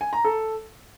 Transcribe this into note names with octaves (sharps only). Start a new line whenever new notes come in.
G#5
A#5
A4